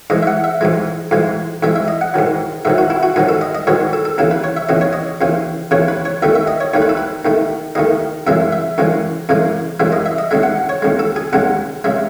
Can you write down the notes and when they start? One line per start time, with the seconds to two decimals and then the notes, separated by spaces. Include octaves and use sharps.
0.10 G#2 E3 G#3 D#5
0.23 E5
0.27 F#5
0.44 E5
0.61 G#2 E3 G#3
1.11 G#2 E3 G#3
1.63 G#2 E3 G#3 E5
1.76 E5
1.88 D#5
2.01 F#5
2.14 G#2 D#3 F#3
2.65 G#2 D#3 F#3 E5
2.78 F#4
2.90 E4
3.03 F#4
3.16 G#2 D#3 F#3 G#4
3.29 A4
3.41 D#5
3.55 D#5
3.67 G#2 D#3 F#3 C#5
3.93 A4
4.05 A4
4.18 D#2 C#3 E3 A4
4.31 B4
4.44 C#5
4.57 E5
4.69 D#2 C#3 E3 D#5
4.81 C#5
4.93 D#5
5.21 D#2 C#3 E3
5.71 D#2 C#3 E3 C#5
5.88 B4
6.05 C#5
6.22 D#2 D#3 A3 E5
6.35 E5
6.47 D#5
6.60 C#5
6.74 D#2 D#3 A3 C#5
6.82 B4
6.89 A4
6.97 B4
7.25 D#2 D#3 A3
7.75 D#2 D#3 A3 D#5
8.27 F#2 C#3 E3 G#3 E5
8.52 E5
8.78 F#2 C#3 E3 G#3
9.29 F#2 C#3 E3 G#3
9.80 F#2 C#3 E3 G#3 E5
9.92 D#5
10.06 E5
10.18 D#5
10.31 D#2 C#3 G#3 E5
10.43 F#5
10.69 C#5
10.82 D#2 C#3 G#3
10.99 A4
11.16 G#4
11.33 D#2 C#3 G#3 F#5
11.84 C#3 G#3 E5